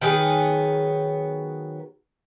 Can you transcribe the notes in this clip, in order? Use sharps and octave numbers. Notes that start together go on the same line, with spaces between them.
D#3 F#3 B3 G#4